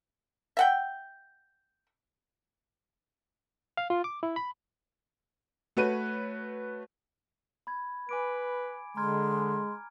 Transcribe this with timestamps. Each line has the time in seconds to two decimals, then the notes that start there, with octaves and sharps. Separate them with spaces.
0.57 E5 F#5 G5
3.77 F5
3.90 F4
4.04 D6
4.23 E4
4.36 B5
5.77 A3 F#4 B4 C#5 D#7
7.67 B5 G#6
8.09 B4 G#5 D6 D7
8.97 D3 G#3 A#5 C6 F6 G#6